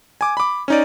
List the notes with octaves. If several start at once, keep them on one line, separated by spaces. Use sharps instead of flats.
G#5 D6
B5 D6
C#4 D#4 D5